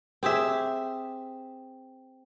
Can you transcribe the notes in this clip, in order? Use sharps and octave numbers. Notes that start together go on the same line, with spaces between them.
C4 G4 G#4 E5